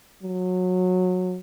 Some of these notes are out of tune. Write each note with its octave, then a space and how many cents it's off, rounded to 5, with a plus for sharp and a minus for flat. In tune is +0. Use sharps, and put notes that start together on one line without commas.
F#3 -20